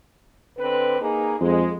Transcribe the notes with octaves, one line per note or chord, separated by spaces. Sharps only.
D3 C4 B4
A#3 D#4 G#4
F2 G#3